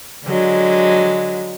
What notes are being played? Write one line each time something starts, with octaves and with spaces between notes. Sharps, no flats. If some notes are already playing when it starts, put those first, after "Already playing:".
D3 F#3 G#3